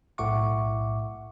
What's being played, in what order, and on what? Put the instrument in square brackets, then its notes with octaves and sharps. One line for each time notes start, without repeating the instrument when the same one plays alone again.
[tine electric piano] B1 A2 E5 F#5 C#6 D6